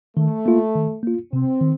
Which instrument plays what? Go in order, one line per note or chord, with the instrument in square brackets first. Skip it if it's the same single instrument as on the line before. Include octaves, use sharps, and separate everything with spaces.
[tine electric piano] D#3 [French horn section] A3
[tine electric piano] A#3 F4
D#3
A#3 F4
[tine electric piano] C3 [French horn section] C4
[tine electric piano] D#3